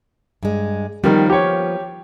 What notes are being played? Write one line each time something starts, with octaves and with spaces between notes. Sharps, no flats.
G2 G#3
D#3 F3 G3 A#3 B3
G4 C#5